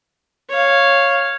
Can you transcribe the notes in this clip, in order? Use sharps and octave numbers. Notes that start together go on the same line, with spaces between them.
C#5 F5